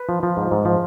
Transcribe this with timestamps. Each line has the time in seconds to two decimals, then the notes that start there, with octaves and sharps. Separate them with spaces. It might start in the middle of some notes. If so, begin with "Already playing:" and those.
Already playing: B4
0.09 F3
0.23 F3
0.37 G#2
0.51 G#2
0.65 F3